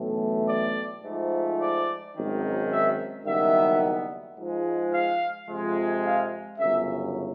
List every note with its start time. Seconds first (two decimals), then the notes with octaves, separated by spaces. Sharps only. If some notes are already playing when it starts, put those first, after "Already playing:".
Already playing: B1 A2 E3 A3
0.48 D5
1.04 G#2 F3 A3
1.60 D5
2.15 G#1 F#2 D#3
2.70 E5
3.25 F#1 F#2 D#3 G3 B3 E5
4.37 G#2 F3 G#3
4.92 F5
5.49 F2 C3 F3 G#3
6.04 F5
6.59 G1 F#2 C#3 E5